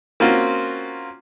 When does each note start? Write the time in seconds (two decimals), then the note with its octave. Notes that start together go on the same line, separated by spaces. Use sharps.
0.20 A#3 C4 C#4 F4 F#4